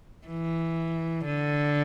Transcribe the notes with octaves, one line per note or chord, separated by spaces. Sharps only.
E3
D3